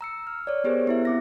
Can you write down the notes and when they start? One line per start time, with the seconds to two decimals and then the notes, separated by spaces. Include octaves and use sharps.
0.01 A#5 E6 C#7
0.27 F6
0.47 C#5 D5
0.64 B3 G4 G#4 A#4 C5
0.87 B3 E4 E5
1.05 C4 D6 A#6